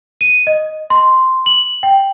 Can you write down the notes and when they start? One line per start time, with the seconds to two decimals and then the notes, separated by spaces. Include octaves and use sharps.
0.21 D#7
0.47 D#5
0.90 C6
1.46 F#7
1.83 G5